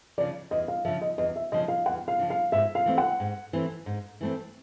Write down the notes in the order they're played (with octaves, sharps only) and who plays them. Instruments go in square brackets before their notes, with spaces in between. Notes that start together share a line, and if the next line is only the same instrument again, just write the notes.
[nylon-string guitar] C#3 F3 [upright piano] D5
[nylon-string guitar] E2 [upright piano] D#5
[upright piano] F5
[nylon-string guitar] F3 [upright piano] E5
[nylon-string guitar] C#3
[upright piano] D#5
[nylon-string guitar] E2 [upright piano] D#5
[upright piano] E5
[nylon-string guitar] C#3 F3 [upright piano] D#5
[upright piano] F5
[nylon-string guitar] E2 [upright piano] F#5
[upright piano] F5
[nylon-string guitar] C#3 F3
[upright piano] F5
[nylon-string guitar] G#2 [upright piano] E5
[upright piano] F5
[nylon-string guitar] E3 A3 C4
[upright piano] F#5
[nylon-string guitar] G#2
E3 A3 C4
G#2
E3 A3 C4